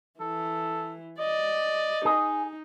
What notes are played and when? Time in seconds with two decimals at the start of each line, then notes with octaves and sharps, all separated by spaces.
0.20 E3 A4
1.19 D5 D#5
2.05 D#4 G#4